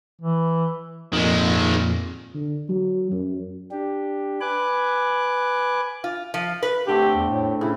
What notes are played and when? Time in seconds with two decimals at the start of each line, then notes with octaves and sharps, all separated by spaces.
0.21 E3
1.13 F2 A#2 D#3 G#3
2.34 D3
2.69 F#3
3.12 F#2
3.71 D4 G4
4.41 B4 G#5 D6 F#6
6.04 F4
6.34 F3
6.63 B4
6.87 D3 A3 C4 G4
7.16 E2
7.30 A2
7.61 C#3 E4